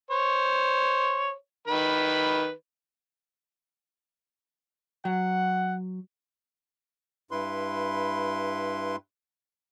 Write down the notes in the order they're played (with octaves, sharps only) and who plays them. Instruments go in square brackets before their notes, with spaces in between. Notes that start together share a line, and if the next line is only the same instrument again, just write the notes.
[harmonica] C5 C#5
D#3 B4 B5
[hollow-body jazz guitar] F#3 [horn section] F#5
[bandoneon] G2 E4 B4 C6